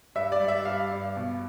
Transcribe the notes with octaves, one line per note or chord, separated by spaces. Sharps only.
G2 E5
D5
G3
E5
G2 F5
G2
B2